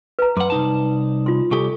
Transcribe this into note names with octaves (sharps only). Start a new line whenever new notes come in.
B4 A#5
F#2 F#5 B5 C6 D6
C2 D#4 A5
F4 C6
C2 G4 A4 G#5 C#6